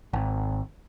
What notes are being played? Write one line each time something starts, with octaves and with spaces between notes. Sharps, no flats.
G#1